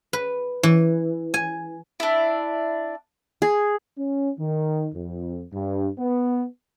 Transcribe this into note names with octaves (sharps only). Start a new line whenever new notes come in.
B4
E3
G#5
D4 E4
G#4
C#4
D#3
F2
G2
B3